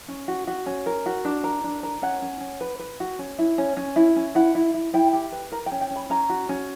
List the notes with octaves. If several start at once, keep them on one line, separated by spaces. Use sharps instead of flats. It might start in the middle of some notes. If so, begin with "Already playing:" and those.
C#4
F#4
F#4
C#4
A#4
F#4
D4
A#4
D4
A#4
C#4 F#5
C#4
C#4
B4
B4
F#4
C#4
E4
C#4
C#4
E4
C#4
E4 F#5
E4
E4
E4 G5
G4
B4
A#4 A#5
G5
C#4
G5
C#4
B5
C#4 A#5
F#4
C#4